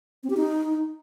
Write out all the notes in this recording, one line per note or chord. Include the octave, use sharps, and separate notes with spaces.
C4
G4
D#4